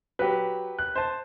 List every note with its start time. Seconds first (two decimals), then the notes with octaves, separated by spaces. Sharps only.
0.19 F#3 G4 B4
0.79 F#6
0.96 C5 A5